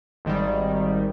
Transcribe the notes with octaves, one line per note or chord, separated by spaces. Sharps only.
G#1 D#3 G3